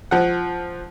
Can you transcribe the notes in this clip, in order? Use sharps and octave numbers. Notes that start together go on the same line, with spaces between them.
F3 F#5